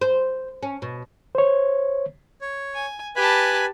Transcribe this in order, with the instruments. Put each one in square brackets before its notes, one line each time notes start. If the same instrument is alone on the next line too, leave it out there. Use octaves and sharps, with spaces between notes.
[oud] C5
C#4
B2
[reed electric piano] C5 C#5
[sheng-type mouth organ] C#5
[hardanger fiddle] G#5
[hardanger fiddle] G4 A5 [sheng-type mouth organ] B4 G#5 B5